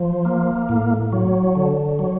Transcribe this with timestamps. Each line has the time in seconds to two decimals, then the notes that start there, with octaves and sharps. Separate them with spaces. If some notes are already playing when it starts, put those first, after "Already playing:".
Already playing: F3
0.25 A#3
0.69 A2
1.12 F#3
1.55 D3
1.99 F#3